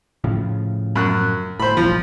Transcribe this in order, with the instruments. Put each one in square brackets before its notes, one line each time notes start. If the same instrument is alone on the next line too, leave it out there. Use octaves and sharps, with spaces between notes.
[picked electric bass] A2 C#3 F3
[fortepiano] F#2 F#6
[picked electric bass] A2 [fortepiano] C5 B5
[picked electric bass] F1 A#1 F2 [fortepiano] F3